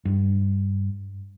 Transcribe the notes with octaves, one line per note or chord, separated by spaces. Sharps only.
G2